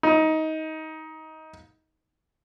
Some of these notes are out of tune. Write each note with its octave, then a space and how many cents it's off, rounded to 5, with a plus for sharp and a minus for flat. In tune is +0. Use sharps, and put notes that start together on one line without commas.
D#4 +20